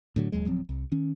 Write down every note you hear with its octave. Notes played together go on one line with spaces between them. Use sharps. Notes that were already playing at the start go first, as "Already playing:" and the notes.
A2 D3 F#3
D#1 D#2 F#3 G#3
D1 F3 F#3 C4
C2
D#3 C#4